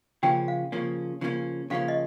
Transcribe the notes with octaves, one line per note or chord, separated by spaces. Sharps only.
C#3 F3 A#3 C#4 G5
F5
C#3 F3 A#3 C#4
C#3 F3 A#3 C#4
C#3 F3 A#3 C#4 F5
D#5